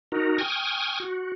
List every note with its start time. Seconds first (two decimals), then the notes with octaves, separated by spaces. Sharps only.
0.12 D#4 F#4 A#4
0.38 G5 G#5 C#6 D#6 F6
1.00 F#4